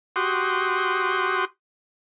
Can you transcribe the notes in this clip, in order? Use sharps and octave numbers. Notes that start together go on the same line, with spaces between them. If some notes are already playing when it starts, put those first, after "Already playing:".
F#4 G4 C6 D#6